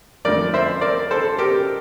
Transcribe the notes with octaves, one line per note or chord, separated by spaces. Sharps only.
F2 D3 A3 A#4 D5
C5 E5
A#4 D5
A4 C5
G4 A#4